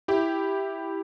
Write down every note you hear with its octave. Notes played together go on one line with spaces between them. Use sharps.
E4 G4